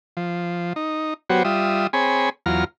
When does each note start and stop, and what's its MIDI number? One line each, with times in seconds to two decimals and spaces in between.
0.17 0.73 53
0.76 1.14 63
1.30 1.43 54
1.30 1.43 59
1.30 1.43 66
1.30 1.43 67
1.30 1.43 72
1.30 1.43 73
1.45 1.87 55
1.45 1.87 65
1.45 1.87 76
1.45 1.87 87
1.93 2.30 60
1.93 2.30 68
1.93 2.30 73
1.93 2.30 80
1.93 2.30 83
2.46 2.64 40
2.46 2.64 54
2.46 2.64 65
2.46 2.64 82
2.46 2.64 89